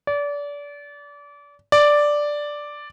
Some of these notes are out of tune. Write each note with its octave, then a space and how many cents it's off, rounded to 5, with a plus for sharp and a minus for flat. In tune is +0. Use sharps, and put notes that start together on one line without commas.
D5 -30
D5 +0